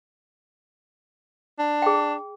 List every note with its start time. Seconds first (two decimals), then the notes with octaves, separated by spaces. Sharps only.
1.59 D4
1.82 G#4 G5